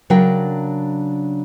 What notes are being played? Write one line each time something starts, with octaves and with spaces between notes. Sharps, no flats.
C#3 F#3 D4 A#4 G5